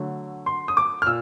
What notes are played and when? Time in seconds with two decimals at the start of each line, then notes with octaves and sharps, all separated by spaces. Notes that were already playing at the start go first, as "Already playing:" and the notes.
Already playing: D3 F#3 A3
0.46 C6
0.68 D#6
0.77 D6
1.02 F6
1.06 A#2 E6